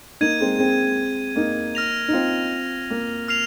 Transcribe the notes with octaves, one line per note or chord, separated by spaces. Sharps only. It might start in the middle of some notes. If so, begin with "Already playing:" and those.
A#3 D#4 G#6 D#7
G#3 C4
G#3 C4
A#3 D#4
F6 A#6 F7
D#4
C4 F4
A#3
F6 C7 F7